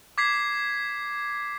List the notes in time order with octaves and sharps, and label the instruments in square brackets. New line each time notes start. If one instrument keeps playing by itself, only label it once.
[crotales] D6 G#6 B6 C7